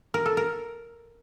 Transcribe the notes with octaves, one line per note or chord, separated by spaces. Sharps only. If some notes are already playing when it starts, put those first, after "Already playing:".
A#4
A4
A#4